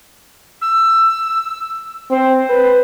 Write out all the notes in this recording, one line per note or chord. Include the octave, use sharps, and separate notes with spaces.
E6
C4 C5
B4